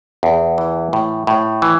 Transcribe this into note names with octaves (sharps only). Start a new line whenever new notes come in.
E2
E3
A2
A2
E3